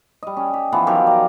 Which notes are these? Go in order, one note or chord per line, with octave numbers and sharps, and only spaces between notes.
G3 D#5
C#4
G4
E3 F3 B3
D#3 F3 F#3 G4
D5 A#5